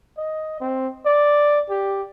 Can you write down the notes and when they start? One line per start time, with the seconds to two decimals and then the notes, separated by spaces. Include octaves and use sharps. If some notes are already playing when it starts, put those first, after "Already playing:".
0.17 D#5
0.61 C4
1.06 D5
1.70 G4